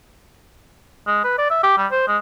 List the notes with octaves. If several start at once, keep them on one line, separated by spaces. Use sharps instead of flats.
G#3
B4
D5
E5
G4
G3
C5
G#3